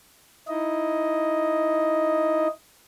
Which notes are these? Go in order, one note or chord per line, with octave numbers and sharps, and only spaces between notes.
D#4 E4 D#5